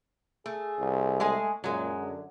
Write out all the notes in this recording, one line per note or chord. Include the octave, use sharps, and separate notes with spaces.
A3 G#4
C2
G#3 A3 G#4 G#5
F#2 A#2 F#3 G#3
D3